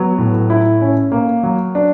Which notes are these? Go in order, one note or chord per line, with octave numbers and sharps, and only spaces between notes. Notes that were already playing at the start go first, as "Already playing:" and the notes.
Already playing: F#3 B3
A2
E4
C#4
A#3
F#3
D4